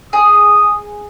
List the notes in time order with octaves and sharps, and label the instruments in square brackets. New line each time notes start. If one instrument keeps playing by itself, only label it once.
[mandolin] G#4 [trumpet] D#6